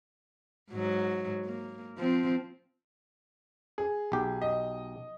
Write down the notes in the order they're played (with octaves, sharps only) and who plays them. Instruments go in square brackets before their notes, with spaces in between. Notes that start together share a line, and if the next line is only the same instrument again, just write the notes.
[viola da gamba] G#2 F#3
A#3
F3 C4
[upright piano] G#4
[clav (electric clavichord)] B1 G4
[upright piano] D#5